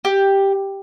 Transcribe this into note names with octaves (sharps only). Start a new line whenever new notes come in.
G4